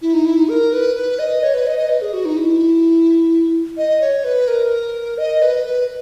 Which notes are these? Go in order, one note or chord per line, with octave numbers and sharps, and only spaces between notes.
E4
D#4
E4
D#4
A#4
B4
B4
D#5
C#5
B4
D#5
D#5
B4
G#4
F#4
D#4
E4
D#5
C#5
B4
A#4
D#5
B4
B4